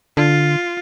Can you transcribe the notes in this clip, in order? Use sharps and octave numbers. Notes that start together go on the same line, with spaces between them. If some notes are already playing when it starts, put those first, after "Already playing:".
D3 F4